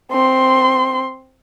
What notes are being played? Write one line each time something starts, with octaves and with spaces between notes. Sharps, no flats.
C4 C6